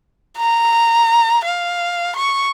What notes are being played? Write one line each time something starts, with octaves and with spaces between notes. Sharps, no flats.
A#5
F5
C#6